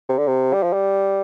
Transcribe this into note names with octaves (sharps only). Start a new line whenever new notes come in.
C3
D3
C3
G3
F3
G3